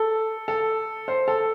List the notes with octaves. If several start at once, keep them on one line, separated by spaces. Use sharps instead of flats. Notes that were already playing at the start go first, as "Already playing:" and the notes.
Already playing: A4
A4
C5
A4